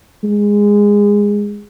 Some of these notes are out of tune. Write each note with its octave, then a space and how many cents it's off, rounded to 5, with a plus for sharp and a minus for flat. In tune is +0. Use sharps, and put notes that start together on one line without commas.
G#3 -15